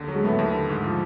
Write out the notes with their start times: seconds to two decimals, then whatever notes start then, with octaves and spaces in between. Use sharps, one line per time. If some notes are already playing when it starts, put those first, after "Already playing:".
Already playing: D#2 D3
0.08 F#3 G#3
0.24 A2 A3 B3
0.39 D#2
0.53 D3
0.69 G#2
0.84 F3